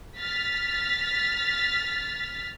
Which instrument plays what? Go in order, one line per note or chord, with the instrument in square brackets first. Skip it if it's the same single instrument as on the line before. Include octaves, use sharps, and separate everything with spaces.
[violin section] F6 A6 B6